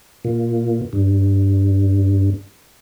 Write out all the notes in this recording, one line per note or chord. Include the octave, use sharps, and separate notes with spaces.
A#2
G2